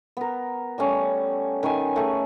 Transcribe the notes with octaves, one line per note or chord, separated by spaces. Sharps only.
B3 A#4
G3 A3 C#4
D#3 C#4 B4 G#5
A3 G#4